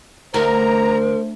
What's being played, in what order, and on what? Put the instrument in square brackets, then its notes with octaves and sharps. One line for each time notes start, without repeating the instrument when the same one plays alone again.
[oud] D2 [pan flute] A#4 [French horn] C5 [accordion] A#5